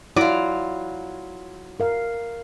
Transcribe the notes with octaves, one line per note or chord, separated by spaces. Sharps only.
F#3 E4 F4 D5
A#4 F5